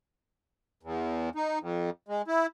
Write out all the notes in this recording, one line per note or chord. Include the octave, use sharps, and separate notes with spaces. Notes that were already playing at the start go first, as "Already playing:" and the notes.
E2
D#4
F2
G#3
E4